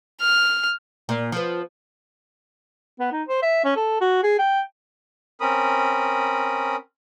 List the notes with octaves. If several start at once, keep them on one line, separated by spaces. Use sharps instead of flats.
F6
A#2
F3 B3
B3
D#4
C5
E5
C#4
A4
F#4
G#4
G5
C4 C#4 A#4 B5 D#6